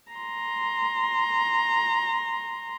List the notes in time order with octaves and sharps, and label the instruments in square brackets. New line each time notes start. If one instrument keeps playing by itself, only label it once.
[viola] A#5 C6